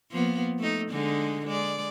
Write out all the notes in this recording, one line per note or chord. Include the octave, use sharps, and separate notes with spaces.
F3 A#3 B3
A3 D#4
D3 G#3 D#4
G#3 D5